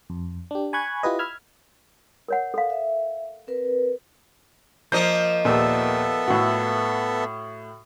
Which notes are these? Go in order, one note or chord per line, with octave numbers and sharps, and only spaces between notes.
F2
D4 G4
G#5 B5 C#6 F#6 G#6
E4 F4 G4 B4 D#5
B5 E6 F6 G#6
A#4 C#5 F#5
A4 F5
E5
C4 A#4 B4
F3 A#3 D#5 G6
D#2 A#2 B3 A4 E5
A2 F#4